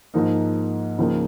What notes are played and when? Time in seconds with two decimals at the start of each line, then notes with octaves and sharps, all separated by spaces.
0.14 G#2 F3 A#3 D#4
0.98 C#2 C#3 F3 A#3 D#4